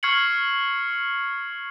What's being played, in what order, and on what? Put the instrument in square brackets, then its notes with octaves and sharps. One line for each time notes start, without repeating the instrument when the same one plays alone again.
[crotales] C#6 F6 G#6 C7 C#7 F#7